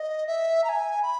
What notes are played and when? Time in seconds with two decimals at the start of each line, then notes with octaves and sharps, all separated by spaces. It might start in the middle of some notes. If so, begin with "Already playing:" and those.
Already playing: D#5
0.27 E5
0.64 A#5
0.69 G#5
1.03 B5